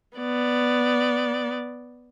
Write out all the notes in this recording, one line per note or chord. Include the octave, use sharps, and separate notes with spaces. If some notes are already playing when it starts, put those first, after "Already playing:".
B3 D5